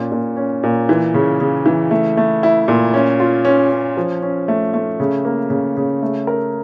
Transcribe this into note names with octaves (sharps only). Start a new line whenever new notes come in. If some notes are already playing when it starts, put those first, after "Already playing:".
Already playing: A#2 C#4
A#2
C#4
A#2
E3
C#3
C#3
E3
A3
A3
E4
A#2
C#4
F4
C#4
C#4
F3
C#4
A3
A3
C#3
A#3
C#3
C#3
A3
A#4